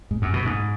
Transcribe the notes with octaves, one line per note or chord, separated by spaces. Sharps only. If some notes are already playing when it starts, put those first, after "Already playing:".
G#2
F#2
B2
G#2